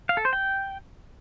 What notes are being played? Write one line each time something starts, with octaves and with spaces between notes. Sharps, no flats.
F5
A4
C5
G5